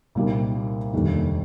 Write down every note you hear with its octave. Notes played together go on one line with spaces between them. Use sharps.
C2 A#2 G3 A#3 D#4
F1 D#2 D3 G3 A#3